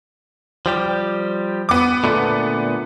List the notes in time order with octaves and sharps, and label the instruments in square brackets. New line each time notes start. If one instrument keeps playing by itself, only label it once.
[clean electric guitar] F3 G3 G4
[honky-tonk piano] B3 D6
[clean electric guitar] A#2 D3 A3